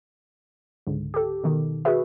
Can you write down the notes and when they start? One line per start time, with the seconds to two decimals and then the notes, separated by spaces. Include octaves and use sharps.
0.87 C#2 G#2 D3
1.14 G4 A4
1.44 B2 D#3
1.85 F#4 G#4 B4 E5